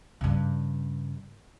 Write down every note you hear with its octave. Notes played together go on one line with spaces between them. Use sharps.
G2 C#3